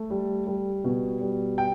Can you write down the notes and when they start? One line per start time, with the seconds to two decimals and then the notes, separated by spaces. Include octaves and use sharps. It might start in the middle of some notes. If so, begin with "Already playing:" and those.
Already playing: A3
0.11 G3
0.47 G3
0.84 B2
1.21 G3
1.58 G5